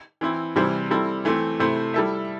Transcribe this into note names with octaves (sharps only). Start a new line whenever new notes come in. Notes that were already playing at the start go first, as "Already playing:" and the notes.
E3 C4 E4
C3 E3 G3 E4 C5
G3 C4 E4 A4
E3 A3 C4
C3 A3 E4 C5
G3 E4 A4 E5